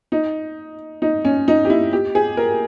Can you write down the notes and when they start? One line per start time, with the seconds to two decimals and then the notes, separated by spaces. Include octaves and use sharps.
0.12 D#4
1.02 D#4
1.25 C#4
1.48 D#4
1.65 G4
1.70 E4
1.93 G4
2.15 G#4
2.37 A#4